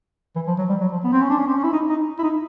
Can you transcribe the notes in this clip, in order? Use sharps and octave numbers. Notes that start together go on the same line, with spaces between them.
E3
F3
F#3
G3
F#3
F3
B3
C4
C#4
D4
C#4
C4
C#4
E4
D#4
D#4
E4
D#4